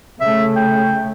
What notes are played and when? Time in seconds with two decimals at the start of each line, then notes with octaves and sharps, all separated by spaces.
0.21 C#3 A3 E5
0.56 G5